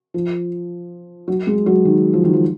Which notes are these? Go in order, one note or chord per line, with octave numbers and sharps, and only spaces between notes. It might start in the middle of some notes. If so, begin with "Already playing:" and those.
F3
F#3
G#3
F#3
D#3
F3
D#3
F3